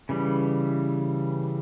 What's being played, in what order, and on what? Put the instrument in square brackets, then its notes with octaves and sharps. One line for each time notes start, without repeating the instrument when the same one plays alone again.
[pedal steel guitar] C#3 E3 G3